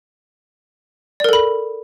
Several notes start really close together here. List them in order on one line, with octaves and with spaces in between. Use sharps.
D5 A#4 A4 B5